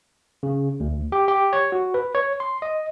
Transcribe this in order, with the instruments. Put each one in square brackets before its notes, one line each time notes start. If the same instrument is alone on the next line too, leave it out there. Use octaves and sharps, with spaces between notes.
[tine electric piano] C#3
D2
G4
G4
C#5
F#4
B4
C#5
C6
D#5